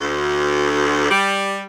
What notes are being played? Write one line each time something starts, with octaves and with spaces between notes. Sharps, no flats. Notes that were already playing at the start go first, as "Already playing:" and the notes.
D2
G3